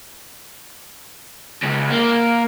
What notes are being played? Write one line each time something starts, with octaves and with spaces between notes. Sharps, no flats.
C#2 C#3
A#3